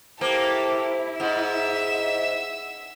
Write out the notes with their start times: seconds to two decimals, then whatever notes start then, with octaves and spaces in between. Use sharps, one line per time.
0.21 A#3 E4 G4 A4 C5
1.20 G#2 E5 F#5 E6